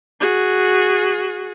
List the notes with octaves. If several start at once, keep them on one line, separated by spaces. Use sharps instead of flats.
F#4 G#4